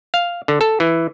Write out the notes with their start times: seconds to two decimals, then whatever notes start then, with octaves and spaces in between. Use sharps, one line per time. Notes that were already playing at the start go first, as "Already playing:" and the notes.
0.14 F5
0.48 D3
0.61 A4
0.80 E3